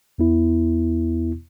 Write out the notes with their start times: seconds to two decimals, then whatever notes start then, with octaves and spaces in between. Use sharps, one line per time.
0.18 E2 B3 E4